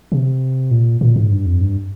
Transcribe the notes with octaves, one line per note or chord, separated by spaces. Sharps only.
C3
A#2
A#2
G#2
G2
F2
G2